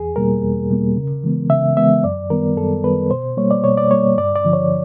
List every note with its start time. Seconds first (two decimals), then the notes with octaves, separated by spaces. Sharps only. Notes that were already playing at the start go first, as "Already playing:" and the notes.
Already playing: E2 G#4
0.16 B2 G3 A#3 A#4
0.43 E2
0.70 B2 G3 A#3
0.96 C#3
1.24 E3 G#3 B3
1.50 C#3 E5
1.77 E3 G#3 B3 E5
2.04 F#2 D5
2.30 D#3 G3 B3 A#4
2.57 F#2 A4
2.84 D#3 G3 B3 B4
3.11 B2 C5
3.37 G3 A#3 C#5
3.51 D5
3.64 B2 C#5
3.77 D5
3.91 G3 A#3 C#5
4.18 G2 D5
4.36 D5
4.45 D3 F3
4.53 C#5